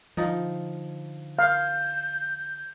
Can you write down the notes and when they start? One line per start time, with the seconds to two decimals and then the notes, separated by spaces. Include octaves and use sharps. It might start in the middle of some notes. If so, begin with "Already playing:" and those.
0.17 D3 F3 D#4
1.39 F5 G6